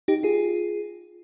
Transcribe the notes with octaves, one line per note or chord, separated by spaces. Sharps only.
D#4 G4
F4 G#4